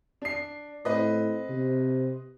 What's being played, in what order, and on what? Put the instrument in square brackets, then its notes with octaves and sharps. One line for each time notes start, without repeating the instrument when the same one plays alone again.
[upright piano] D4 C7
[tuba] A2 [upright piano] C4 B4 D#5
[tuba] C3